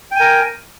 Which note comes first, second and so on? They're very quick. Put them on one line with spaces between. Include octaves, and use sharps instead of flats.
G5 G#5 A#4